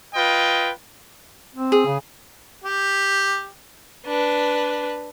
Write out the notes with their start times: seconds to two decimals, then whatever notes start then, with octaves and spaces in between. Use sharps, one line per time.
0.14 F4 B4 D#5 G5
1.55 C4
1.72 G#4
1.86 C#3
2.64 G4
4.06 D4 B4